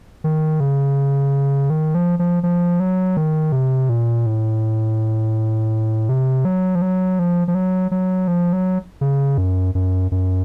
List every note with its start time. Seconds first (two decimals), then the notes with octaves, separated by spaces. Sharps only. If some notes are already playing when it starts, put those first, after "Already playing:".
0.24 D#3
0.60 C#3
1.70 D#3
1.95 F3
2.19 F3
2.43 F3
2.80 F#3
3.17 D#3
3.52 C3
3.89 A#2
4.26 A2
6.09 C3
6.45 F#3
6.75 F3
6.82 F#3
7.19 F3
7.48 F3
7.55 F#3
7.91 F#3
8.28 F3
8.53 F#3
9.01 C#3
9.38 F#2
9.75 F#2
10.12 F#2